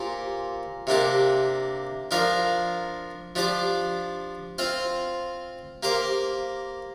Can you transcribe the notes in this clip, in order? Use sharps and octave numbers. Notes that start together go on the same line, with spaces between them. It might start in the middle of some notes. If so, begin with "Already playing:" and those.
Already playing: A#2 A#3 G4 C5
C3 A#3 D4 G4
F3 D4 A#4 D5 F5
F3 D4 G4 D5
C4 F4 C5 F5
A#3 G4 C5 F5